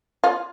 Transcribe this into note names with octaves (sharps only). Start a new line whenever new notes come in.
F4